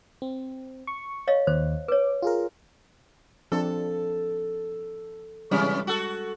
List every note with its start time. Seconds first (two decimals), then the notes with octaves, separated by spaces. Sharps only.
0.22 C4
0.87 C#6
1.28 C#5 D#5 F5
1.47 D#2 C5
1.88 B4 C#5 D6
2.22 F4 G#4 A#4
3.52 F3 C4 D4 A4
5.51 C3 E3 G3 G#3 C#4 G#4
5.87 F#4 A4